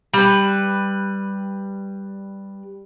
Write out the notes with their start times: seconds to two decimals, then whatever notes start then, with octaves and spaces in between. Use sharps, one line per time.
0.14 G3 B4